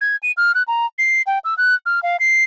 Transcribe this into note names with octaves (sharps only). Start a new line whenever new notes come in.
G#6
D#7
F6
F#6
A#5
C7
G5
E6
F#6
F6
F5
C7